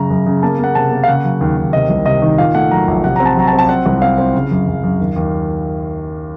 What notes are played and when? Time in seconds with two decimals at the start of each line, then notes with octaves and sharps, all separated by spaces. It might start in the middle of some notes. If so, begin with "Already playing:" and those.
Already playing: F#2 C#3 A#5
0.10 F#2
0.26 C#3
0.43 A#3 A5
0.59 A#3 F#5
0.75 C3 A5
0.91 A#3
1.03 F5
1.08 C#3 F#5
1.24 F#3
1.41 D#2
1.57 D#2
1.73 C3 D#5
1.89 C2
2.06 C3 D#5
2.22 D#3
2.38 A#2 F5
2.55 A3 F#5
2.71 F#3 A#5
2.88 A#1
3.04 C3 F#5
3.16 C4 A#5
3.26 A5
3.37 F#3 A#5
3.47 A5
3.53 C4
3.59 A5
3.69 C4 F#5
3.86 C2
4.02 C4 F5
4.18 C4
4.34 C#3
4.51 F#2
4.67 F#2
4.83 F#2
5.00 D#2
5.16 D#2